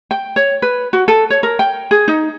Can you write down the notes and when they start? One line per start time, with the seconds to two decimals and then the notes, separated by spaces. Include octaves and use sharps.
0.11 G5
0.36 C#5
0.62 B4
0.93 F#4
1.08 A4
1.30 C#5
1.43 A#4
1.59 G5
1.91 G#4
2.08 D#4